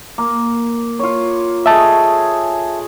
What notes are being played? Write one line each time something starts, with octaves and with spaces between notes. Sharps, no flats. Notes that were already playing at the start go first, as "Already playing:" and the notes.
A#3
F4 C#5
G#4 A4 D#5 E5 A5